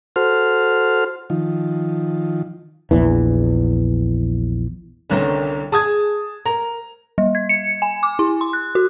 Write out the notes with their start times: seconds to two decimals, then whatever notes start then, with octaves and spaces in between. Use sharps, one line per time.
0.16 F#4 A4 C5 F6
1.30 D#3 F3
2.91 A#1 E2 E3
5.10 C2 D3 D#3 B3 C#4
5.72 G#4 A5 D#6 G#6
6.46 A#4 A#5
7.18 G3
7.35 G#6
7.49 C#7
7.82 G#5
8.03 D6
8.19 E4
8.41 C6
8.53 F#6
8.75 F#4